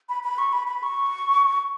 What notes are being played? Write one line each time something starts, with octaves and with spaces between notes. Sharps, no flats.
B5
B5
C#6
B5
B5
C#6